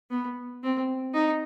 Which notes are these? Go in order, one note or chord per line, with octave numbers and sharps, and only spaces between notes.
B3
C4
D#4